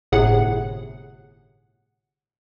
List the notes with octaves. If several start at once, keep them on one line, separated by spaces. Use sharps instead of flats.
G1 A2 C3 G#4 F#5